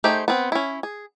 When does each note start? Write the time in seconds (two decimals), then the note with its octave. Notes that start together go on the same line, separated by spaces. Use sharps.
0.04 A3 D#4 G4 G#4 C5
0.28 B3 C4
0.52 C#4 E4
0.83 G#4